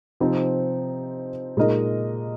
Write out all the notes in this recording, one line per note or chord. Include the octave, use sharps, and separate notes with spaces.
C3 F3 C4 D#4
A#2 G#3 D#4 A#4 D#5